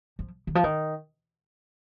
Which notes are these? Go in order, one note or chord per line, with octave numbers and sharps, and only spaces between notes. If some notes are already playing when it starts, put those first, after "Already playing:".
F3
D#3
F3
D#3